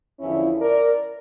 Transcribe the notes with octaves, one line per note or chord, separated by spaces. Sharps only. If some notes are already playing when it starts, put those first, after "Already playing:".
E2 D3 F3 C#4 E4
A#4 D5